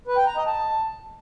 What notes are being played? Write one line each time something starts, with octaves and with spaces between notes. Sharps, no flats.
B4
G5
A#5
D#5
A5